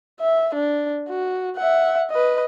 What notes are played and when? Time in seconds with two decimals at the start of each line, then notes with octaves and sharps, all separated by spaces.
0.21 E5
0.54 D4
1.08 F#4
1.56 E5 F#5
2.10 B4 D#5